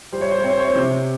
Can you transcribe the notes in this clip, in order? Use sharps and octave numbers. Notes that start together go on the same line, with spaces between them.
G3 C5
C#5
C5
C4 C#5
C5
C#5
C5
C3